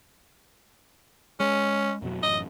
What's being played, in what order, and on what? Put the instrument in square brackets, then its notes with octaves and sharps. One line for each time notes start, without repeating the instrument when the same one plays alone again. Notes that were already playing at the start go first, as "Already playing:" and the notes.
[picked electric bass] G#3 [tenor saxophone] C#4
[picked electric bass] F2 B2 F#3
[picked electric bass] A1 F#2 [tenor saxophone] D#5